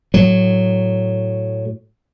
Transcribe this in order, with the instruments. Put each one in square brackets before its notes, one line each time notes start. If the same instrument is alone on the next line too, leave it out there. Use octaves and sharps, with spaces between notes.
[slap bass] A2 F#3